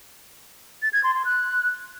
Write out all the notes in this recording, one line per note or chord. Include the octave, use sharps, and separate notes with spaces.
A6
G#6
C6
C6
F#6